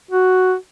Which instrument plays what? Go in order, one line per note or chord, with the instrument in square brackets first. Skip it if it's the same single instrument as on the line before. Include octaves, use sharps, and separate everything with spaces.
[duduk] F#4